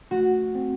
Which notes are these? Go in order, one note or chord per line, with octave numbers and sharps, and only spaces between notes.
A3 F#4
C4